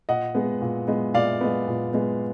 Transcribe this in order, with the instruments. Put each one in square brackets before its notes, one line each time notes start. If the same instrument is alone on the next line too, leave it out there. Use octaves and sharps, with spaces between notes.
[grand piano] A#2 D#5 F#5
G#3 B3
A#2
G#3 B3
A#2 D5 F5
G#3 B3
A#2
G#3 B3